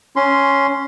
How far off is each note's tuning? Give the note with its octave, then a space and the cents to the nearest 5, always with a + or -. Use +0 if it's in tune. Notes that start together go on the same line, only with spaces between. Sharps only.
C#4 +0 C6 -5